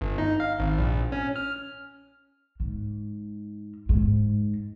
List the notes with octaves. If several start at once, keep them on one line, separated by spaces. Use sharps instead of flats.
G1
D#4
F5
G#1
A#1
C#4
F6
G#2
G#2